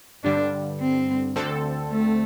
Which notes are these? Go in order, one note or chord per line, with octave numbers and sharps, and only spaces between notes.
G2 D3 G3 D4
C4
D2 D3 C4 A4
A3